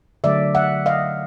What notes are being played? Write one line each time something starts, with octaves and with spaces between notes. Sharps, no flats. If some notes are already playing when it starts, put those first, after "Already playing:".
D3 F#3 A3 D5 E5
E5 F#5
D#5 F5